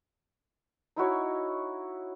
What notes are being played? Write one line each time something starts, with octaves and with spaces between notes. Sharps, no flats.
D#4 E4 F#4 C#5